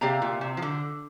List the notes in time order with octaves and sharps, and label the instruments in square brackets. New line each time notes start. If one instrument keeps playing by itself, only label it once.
[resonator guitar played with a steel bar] C3 [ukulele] G4 D5 F5 A#5
[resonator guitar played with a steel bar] A#2
C3
F3
D3